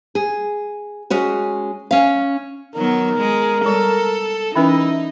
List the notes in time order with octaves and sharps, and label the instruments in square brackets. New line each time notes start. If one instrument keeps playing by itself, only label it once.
[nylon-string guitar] G#4
G#3 C#4 F#4
C#4 F5
[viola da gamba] D#3 F#3 B3 [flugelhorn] A#4
[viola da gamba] G#3
[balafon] G3 G#3 [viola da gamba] A4
[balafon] E3 C#4 B4 [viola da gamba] D#4 [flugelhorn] E4